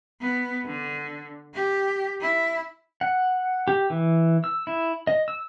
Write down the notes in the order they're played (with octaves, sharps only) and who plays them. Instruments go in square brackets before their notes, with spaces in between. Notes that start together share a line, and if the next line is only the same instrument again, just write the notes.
[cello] B3
D3
G4
E4
[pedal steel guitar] F#5
G4
E3
E6
E4
D#5
E6